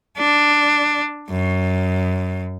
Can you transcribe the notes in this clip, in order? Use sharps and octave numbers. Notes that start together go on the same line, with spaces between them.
D4
F#2